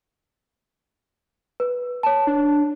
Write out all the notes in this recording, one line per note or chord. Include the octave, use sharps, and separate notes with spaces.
B4
C#5 A5
D4